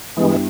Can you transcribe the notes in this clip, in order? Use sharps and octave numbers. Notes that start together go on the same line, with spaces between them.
G2 E3 G3 G#3 B3 E4